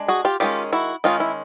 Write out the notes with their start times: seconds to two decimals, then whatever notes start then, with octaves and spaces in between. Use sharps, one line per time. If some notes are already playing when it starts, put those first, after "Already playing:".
Already playing: G#3 D4
0.08 F#4 G#4
0.25 F4 G4
0.40 D#3 G#3 C#4 F4 G4
0.73 E4 F#4
1.04 D#3 G#3 C#4 D#4 F4
1.20 E4